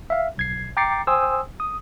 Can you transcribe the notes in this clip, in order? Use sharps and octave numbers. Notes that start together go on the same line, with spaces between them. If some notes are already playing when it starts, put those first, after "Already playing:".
E5 F5
B1 G#6 C7
G5 A#5 D6 A6 C7 C#7
C5 G5 G#5 C6 D#6 E6
D#6